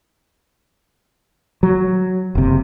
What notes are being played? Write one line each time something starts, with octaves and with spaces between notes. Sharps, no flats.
F#3
F#1 C3